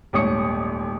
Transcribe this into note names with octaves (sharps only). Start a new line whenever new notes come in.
D#1 G#1 D2 C#5 D#6 C#7